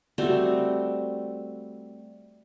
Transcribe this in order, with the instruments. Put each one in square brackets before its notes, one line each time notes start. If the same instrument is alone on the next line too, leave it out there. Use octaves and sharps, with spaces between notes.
[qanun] G3 A3 C4 F#4